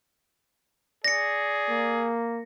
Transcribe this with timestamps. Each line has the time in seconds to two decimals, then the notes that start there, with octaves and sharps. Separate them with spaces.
1.04 G#4 D5 A#6 C#7
1.70 A#3